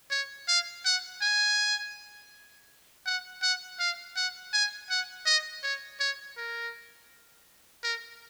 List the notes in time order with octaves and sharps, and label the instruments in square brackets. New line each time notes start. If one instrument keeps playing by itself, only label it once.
[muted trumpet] C#5
F5
F#5
G#5
F#5
F#5
F5
F#5
G#5
F#5
D#5
C#5
C#5
A#4
A#4